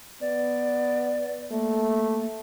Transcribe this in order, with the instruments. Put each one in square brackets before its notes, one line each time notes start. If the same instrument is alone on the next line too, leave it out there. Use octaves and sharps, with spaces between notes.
[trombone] B3 [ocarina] D5
[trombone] A3 [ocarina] A#3